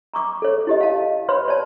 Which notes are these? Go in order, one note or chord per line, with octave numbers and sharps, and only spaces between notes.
A#5 C#6 D6
A4 C#5
E4 G4 D#5
F5 A5
B4 C#5 B5 C6
C#5 D5 A5